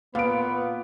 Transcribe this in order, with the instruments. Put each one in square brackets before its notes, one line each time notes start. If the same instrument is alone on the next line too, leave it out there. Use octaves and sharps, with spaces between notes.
[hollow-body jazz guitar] A#2 [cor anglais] B3 [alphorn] B4 [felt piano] F5 D7